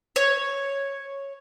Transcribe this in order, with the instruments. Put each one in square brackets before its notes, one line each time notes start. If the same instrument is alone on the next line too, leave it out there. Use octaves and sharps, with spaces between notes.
[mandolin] C#5